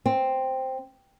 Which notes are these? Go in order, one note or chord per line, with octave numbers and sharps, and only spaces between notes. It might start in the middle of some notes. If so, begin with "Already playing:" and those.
C4